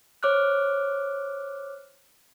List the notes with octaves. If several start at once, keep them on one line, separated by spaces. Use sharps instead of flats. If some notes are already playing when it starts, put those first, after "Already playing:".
C5 C#5 D6 F6 F#6